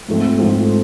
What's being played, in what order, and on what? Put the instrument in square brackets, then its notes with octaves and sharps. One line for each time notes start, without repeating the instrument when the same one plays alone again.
[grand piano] G#2 F3 A3 C4
G#2 F3 A3 C4